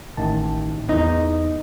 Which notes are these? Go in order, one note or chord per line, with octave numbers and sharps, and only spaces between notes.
A1 D#3 A5
E2 D#4 D#5